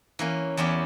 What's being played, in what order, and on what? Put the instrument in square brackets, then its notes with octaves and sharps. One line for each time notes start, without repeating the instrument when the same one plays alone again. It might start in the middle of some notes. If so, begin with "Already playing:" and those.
[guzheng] E3 A#3 C#4
E2 C#4 E4 G4 G5